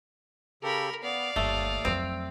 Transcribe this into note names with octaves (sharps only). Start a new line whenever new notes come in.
C#3 G4 A4 A#4 B5
B3 D5 F5
G1 D#2 A3 D#6
F2 F#3 C4